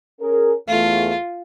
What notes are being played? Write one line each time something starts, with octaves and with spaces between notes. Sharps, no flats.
C#4 G#4 A#4
E2 A3 F4